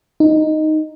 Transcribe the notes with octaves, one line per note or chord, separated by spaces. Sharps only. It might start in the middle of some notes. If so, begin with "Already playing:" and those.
D#4